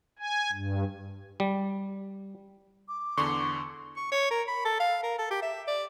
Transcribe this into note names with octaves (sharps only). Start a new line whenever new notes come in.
G#5
G2
G3
D6
E2 D3 C6 C#6
C#6
C#5
A#4
B5
A4
F5
A#4
A4
G4
E5
D5